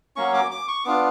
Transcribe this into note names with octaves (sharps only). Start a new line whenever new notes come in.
F#3 A#3 C#4 C#6
D6
D6
C#6
B3 D4 F4 D6